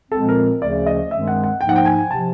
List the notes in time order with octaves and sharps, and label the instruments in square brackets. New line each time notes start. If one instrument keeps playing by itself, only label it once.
[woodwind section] A#2 F3 G#3 C4 [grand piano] A4
[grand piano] A#4
[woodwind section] D2 C#3 F3 A3 C#4 [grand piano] D5
[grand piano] D#5
[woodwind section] G2 D#3 G#3 C4 [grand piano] E5
[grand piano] F#5
F#5
[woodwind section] G#2 F3 A#3 D#4 [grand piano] G5
[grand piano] F#5
G5
G#5
[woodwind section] C3 F3 [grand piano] A5